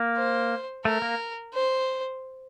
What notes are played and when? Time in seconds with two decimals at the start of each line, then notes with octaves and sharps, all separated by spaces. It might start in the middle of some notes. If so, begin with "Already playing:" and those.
Already playing: A#3
0.17 C5
0.85 A3 A#4
1.02 A#3
1.54 C5